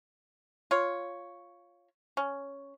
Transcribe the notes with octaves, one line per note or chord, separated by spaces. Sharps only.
F4 C#5
C#4